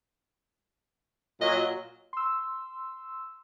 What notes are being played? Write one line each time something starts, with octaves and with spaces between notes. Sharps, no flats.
A#2 F#3 D#5
C6 E6